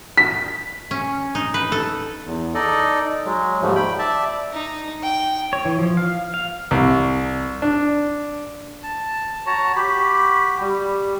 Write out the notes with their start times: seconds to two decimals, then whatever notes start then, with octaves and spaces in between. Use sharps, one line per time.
0.18 B6
0.91 C#4
1.35 D#4
1.54 B4
1.72 A4
2.26 E2
2.55 D#4 A4 D5 D#5
3.25 F#3 G#3
3.62 D#2 G#2 F3 G3 A3
3.76 G5 B5
3.99 D5 E5 A5
4.53 D#4
5.03 G5
5.53 C#5
5.65 E3
5.79 F3
5.97 F5
6.34 F5
6.71 C2
7.62 D4
8.83 A5
9.46 F#4 C#5 A5 A#5
9.76 F#4 G4 B5
10.61 G3